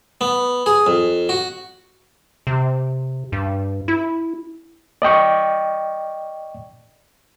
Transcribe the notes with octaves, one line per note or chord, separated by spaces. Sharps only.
B3
G#4
F2
F#4
C3
G2
E4
D5 D#5 G5 C#6